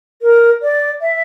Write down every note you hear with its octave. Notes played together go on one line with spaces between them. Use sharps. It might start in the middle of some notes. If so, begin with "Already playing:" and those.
A#4
D5
E5